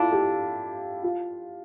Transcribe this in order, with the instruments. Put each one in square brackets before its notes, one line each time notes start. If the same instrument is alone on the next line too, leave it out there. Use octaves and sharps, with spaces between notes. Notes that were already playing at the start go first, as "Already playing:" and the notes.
Already playing: [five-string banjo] D4 A4 [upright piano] E4 F4
[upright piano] G4
F4